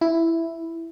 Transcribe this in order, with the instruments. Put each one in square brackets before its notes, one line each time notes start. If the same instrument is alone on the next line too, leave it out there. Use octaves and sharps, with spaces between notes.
[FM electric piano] E4